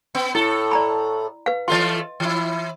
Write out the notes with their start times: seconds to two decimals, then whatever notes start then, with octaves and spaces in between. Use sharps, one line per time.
0.15 B3
0.35 A2 E4 A4
0.71 D5 A#5 B5
1.46 B4 F5
1.68 E3 A3 F4 D#5 C6
2.20 E3 E4